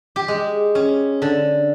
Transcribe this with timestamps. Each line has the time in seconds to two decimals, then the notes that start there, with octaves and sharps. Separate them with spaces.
0.16 G4
0.28 G#3
0.75 C#4
1.22 D3